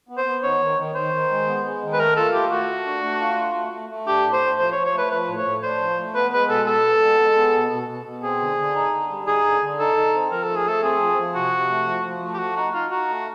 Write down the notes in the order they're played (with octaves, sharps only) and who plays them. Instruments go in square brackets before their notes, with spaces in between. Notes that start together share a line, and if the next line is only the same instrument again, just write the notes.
[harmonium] B3
[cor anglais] C5
[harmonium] B3
[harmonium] D#3 [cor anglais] C#5
[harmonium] D#3
D#3
[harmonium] D#3 [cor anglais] C5
[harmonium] D#3
G#3
B3
G#3
D#3
[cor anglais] B4
[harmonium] A3 [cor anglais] A#4
[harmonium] F4 [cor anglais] A4
[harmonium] A3 [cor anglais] G4
[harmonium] A3 [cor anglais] F#4
[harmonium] A3
D4
A3
F4
A3
A3
A3
A3
[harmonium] D4 [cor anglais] G4
[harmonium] A2
[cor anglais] C5
[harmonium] A3
[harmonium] F3 [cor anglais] C5
[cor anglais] C#5
[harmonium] F3
[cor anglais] C#5
[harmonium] A3 [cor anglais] B4
[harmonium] F3 [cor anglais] B4
[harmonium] A2
[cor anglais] C#5
[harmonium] A2
[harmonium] D4 [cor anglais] C5
[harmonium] F3
A3
[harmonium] B3 [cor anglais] B4
[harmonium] G#3 [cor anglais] B4
[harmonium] B2 [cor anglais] A4
[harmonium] B3 [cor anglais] A4
[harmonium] B3
G#3
G#3
B3
B2
B2
B2
B2
[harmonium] C4 [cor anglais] G#4
[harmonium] D3
D3
D#4
D3
G3
[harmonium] D#4 [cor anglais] G#4
[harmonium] D3
D3
[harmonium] D#4 [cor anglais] A4
[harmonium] D#4
C4
[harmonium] F3 [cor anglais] A#4
[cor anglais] A4
[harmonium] A3
[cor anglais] G#4
[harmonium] A3 [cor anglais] A4
[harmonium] C4 [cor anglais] G#4
[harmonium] F3
F3
[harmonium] C3 [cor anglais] F#4
[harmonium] C3
A3
F3
F3
A3
[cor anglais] G4
[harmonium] A3 [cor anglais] F#4
[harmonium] D#4 [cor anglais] F#4
[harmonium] D#4 [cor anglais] F4
[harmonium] D#4 [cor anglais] F#4
[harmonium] A3